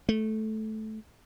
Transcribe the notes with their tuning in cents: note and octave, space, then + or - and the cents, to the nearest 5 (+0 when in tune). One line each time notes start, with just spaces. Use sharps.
A3 -15